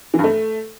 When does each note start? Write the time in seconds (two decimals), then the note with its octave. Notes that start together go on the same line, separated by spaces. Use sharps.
0.14 E3
0.19 G2
0.24 A3